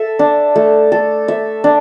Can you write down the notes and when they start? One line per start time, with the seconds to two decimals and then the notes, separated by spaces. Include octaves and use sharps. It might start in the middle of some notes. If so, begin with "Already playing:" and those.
Already playing: A4 E5
0.19 D4
0.55 A3
0.92 A4
1.28 E5
1.64 D4